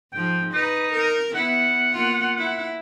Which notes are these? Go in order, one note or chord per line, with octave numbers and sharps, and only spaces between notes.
G#2 F3 G5
D#4 B4
A#4
B3 E4 F#5
A#3 F4
E4